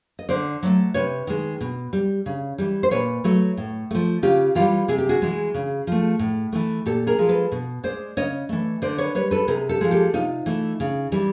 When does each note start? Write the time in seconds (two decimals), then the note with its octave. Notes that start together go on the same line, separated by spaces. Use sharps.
0.19 D#5
0.29 D3 C5 D5
0.63 F#3 A3
0.94 C3 B4 C#5
1.27 D#3 G#3
1.61 B2
1.93 G3
2.26 C#3
2.58 E3 G3
2.83 C5
2.91 A#2 B4 C#5
3.24 F#3 A3
3.57 A2
3.91 F3 A3
4.23 C#3 F4 G4
4.55 E3 G3 F4 G4
4.88 C3 G#4
4.98 G4
5.09 F#4 G#4
5.22 E3 G#3
5.54 C#3
5.87 F3 A3
6.19 A2
6.53 E3 A3
6.86 A#2 G4 A4
7.07 G#4 A#4
7.19 F3 G#3
7.29 A4 B4
7.52 B2
7.84 G#3 C5 D5
8.17 C#3 C#5 D#5
8.49 E3 A3
8.82 D3 C5 D5
8.98 B4 C#5
9.15 G3 B4 C#5
9.31 A4 B4
9.48 C3 G#4 A#4
9.69 G4 A4
9.81 F3 G#3
9.91 G4 A4
10.14 C3 D#4 F4
10.46 E3 A3
10.80 C#3
11.12 E3 G3